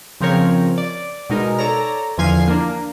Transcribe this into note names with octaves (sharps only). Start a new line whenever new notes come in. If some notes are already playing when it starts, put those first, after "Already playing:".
C#3 F3 C4 A#4 C#5
D5
B2 G#3 D#4 A#4
A4 C#5 D5 A#5
E2 D3 F3 G#5 F6 C7
A#3 D4